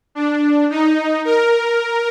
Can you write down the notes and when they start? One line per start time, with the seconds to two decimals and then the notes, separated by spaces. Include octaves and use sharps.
0.15 D4
0.70 D#4
1.25 A#4